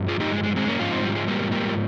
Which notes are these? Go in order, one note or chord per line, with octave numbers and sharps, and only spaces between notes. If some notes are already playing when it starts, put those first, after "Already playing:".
Already playing: G2 F3
F4 G#4
D#4 G4
G#3
G#3
G#3 C4
A#3 C#4
G#2 F3 C#4 F4
C4 D#4
G3
G#3
G3 A#3
G3 A#3